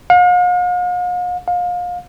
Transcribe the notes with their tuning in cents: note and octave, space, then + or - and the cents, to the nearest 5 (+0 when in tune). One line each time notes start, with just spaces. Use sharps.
F5 +45
F5 +30